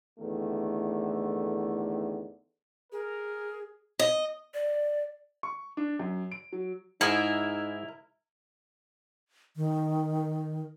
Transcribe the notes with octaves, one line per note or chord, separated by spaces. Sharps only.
E2 A2 D3 D#3 A3
G#4 A#4
D#5
D5
C#6
D4
F#2
D7
F#3
G#2 D#4 E4 G#4 A#4
D#3